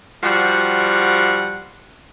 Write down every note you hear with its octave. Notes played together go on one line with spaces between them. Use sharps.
F3 G3 F#4 C5 F#5